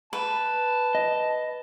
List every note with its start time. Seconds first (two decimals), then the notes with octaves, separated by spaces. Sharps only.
0.13 B4 A5
0.95 D#5